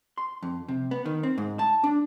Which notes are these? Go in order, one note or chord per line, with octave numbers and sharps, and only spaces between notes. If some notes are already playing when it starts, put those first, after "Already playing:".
C6
F2
C3
B3
D#3
C4
G#2
A5
D4